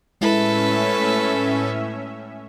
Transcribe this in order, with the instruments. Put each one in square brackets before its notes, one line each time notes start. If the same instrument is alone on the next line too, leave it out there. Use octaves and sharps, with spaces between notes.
[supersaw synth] A2 C#4 E5 [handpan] G#3 E4 [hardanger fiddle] A4 B4